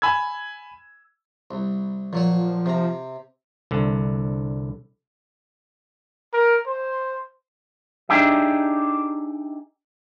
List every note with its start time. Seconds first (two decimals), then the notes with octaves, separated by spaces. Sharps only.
0.02 G#5 B5 E6 G#6
1.51 C2
2.13 A#2 F3 F#3 C#5
2.66 C3 A#5
3.71 C2 D3
6.33 A#4
6.67 C5
8.09 D4 D#4 G4 G#4 E5